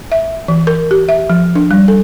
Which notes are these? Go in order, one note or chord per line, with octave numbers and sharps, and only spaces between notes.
E5
E3
A#4
G4
E5
F3
D4
G3
A4